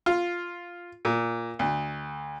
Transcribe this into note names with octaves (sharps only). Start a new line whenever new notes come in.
F4
A#2
D2